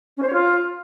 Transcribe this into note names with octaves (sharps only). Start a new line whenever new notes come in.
C#4
C5
C#5
F4